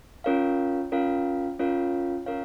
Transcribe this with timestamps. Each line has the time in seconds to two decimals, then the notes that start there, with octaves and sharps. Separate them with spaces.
0.24 C#4 F4 A#4 C#5 F5
0.92 C#4 F4 A#4 C#5 F5
1.59 C#4 F4 A#4 C#5 F5
2.26 C#4 F4 A#4 C#5 F5